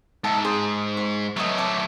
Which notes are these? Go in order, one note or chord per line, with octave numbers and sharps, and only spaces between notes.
G#2 D#4 E5 A5
G#4 C5
C#6
F#3 A3 B4 C#5 D#5
C#5 A5 D6